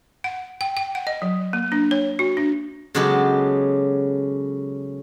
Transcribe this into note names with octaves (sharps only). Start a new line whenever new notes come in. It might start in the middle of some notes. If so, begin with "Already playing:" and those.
F#5
G5
G5
F#5
D#5
F#3
A#3
D4
C#5
F#4
D4
C#3 F#3 G#3 B3 G4 A4